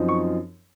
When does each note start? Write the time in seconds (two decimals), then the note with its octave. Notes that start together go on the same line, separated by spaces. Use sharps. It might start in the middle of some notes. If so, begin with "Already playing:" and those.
Already playing: F#2 F3 C4 D#4
0.09 C#6